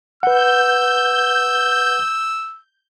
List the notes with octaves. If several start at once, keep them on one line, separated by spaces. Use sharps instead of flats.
B4 F#5 E6 G6